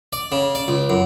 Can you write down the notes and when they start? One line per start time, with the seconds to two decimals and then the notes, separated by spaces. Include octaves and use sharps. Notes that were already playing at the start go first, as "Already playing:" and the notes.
0.13 D5
0.32 C#3
0.55 D5
0.68 C#2
0.89 F#2